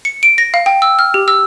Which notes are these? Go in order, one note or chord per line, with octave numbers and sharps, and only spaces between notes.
C#7
D7
A#6
F5
G5
E6
F6
G4
E6